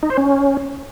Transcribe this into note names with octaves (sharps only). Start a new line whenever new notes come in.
D#4
C5
C#4